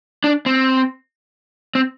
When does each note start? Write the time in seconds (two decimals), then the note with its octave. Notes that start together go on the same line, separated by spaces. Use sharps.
0.24 D4
0.46 C4
1.75 C4